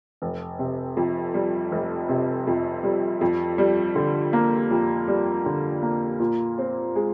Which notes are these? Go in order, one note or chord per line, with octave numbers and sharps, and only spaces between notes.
F1
C3
F2
G3
F1
C3
F2
G3
F2
G3
D3
A#3
F2
G3
D3
A#3
A#2
C4
G#3